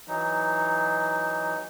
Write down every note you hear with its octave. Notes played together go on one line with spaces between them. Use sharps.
E3 F#3 D#4